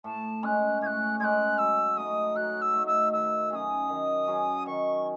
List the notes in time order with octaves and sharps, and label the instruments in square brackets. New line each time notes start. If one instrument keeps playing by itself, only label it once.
[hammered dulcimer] A2 [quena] A5
[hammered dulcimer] G#3 C#4 [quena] F#6
[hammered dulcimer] A2 [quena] G#6
[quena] F#6
[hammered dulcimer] G#3 C#4 [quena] F#6 G#6
[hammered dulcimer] F#3 [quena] E6
[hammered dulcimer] A3 D#4 [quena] D#6
[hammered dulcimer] F#3 [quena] F#6
[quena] E6
[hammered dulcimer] A3 D#4
[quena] E6
[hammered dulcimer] D#3 [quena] E6
[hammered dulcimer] F#3 C#4 G#4 [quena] D#6 E6
[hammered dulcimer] D#3
F#3 C#4 G#4
[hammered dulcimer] D#3 [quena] C#6